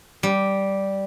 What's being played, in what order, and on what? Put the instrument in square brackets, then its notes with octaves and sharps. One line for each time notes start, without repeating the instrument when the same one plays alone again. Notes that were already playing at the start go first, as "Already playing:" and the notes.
[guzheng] G3